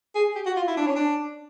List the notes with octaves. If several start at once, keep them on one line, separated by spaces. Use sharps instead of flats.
G#4
G4
F#4
F4
E4
D4
C#4
D4